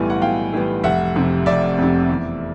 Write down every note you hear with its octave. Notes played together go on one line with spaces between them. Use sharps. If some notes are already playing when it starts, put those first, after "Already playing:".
Already playing: B1 A2 E3 G3 B3 G#5
F#5
B1 F5 G5
A2 E3 G3 B3
F1 E5 F#5
F2 C3
F1 D5 E5
F2 C3
E2